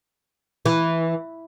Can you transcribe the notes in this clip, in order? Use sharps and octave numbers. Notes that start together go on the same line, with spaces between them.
E3